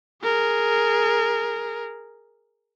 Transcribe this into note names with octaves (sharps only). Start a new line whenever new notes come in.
G#4 A#4